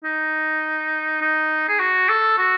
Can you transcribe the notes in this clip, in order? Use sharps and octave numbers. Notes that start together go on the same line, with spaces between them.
D#4
D#4
G#4
F#4
A4
F#4